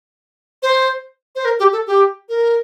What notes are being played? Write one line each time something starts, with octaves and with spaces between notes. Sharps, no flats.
C5
C5
A#4
G4
A4
G4
A#4